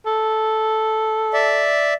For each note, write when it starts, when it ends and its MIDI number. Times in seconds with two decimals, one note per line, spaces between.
0.06 1.74 69
1.33 1.94 74
1.33 1.94 76